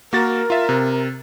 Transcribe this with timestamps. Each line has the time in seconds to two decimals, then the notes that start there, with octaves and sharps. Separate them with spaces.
0.13 A#3 F#4 A#4 A6
0.50 F4 E5
0.69 C3